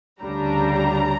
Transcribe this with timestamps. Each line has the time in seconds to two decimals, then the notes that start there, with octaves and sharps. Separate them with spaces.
0.23 D2 C#3 G3 D4 A#5